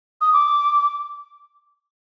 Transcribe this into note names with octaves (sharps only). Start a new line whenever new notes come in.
D#6
D6